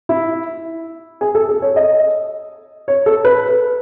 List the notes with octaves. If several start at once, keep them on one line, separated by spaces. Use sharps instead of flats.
E4
G#4
A4
A4
C#5
D#5
C#5
A4
B4